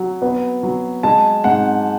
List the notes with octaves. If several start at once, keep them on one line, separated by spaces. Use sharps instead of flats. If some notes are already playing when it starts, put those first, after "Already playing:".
Already playing: F#3
B3
F#3
G#3 A5
G#2 F#5